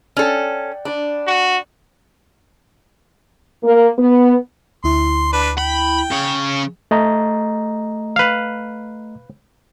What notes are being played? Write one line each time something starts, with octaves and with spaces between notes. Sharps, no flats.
C#4 A4 D5 F#5 G5
D4 D5 B5 D#6
F#4
A#3
B3
D2 E4 C6
D4 B4
G5 B5
C#3 C#5
A3 D#5 A#5
B4 F5